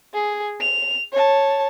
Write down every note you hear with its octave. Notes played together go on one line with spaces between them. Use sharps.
G#4
F7
C#5 A5